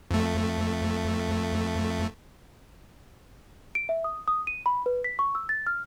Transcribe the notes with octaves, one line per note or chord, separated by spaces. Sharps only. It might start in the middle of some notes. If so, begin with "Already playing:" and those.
F2 A3
D7
E5
D#6
D#6
D#7
B5
B4
B6
C#6
E6
A6
F6